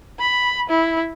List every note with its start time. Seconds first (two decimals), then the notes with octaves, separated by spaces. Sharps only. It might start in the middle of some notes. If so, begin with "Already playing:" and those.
0.19 B5
0.69 E4